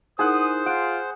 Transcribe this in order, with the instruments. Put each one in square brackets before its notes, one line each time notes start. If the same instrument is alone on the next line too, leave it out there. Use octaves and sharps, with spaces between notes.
[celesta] D#4 E4 A#4 [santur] G#4 F#5 [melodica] C5 [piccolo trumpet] D#6
[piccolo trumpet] F4 [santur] F#5 [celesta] D7